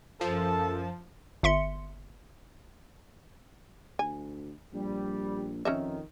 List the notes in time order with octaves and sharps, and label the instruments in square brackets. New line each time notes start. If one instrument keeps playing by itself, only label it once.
[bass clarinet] F#2 [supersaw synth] F3 [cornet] A4 [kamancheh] A5
[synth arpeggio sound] G1 E5 C6 C#7
[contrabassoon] D2 [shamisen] G#5
[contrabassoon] A#1 [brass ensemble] G3
[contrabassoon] F2 [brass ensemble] D#3 [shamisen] C#4 D#4 E5